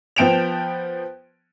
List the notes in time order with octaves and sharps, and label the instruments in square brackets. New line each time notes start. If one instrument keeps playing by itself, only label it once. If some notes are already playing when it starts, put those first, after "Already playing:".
[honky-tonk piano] F3 B3 G5 D7 E7 F7